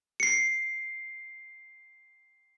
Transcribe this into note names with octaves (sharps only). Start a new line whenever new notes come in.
C7 C#7